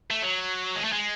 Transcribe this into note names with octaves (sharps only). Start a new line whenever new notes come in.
A3
F#3
G#3
A3
G#3